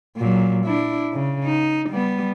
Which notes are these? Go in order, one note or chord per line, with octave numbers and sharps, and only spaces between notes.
A#2 F#3
D4 E4
C#3
D#4
G3 B3